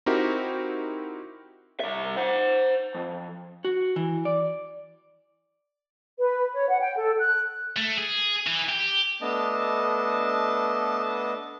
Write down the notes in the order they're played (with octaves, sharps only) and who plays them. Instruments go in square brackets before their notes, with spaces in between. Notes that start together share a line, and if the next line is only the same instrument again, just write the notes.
[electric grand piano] C4 D#4 E4 F#4 G4 A#4
[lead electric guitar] C2 E5
C5 F#5
F2
[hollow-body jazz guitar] F#4
E3
D5
[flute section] B4
C#5
F#5
G5
A4
F#6
[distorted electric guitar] A3
G#4
E3
G4
[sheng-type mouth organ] A3 B3 D4 D#5 A5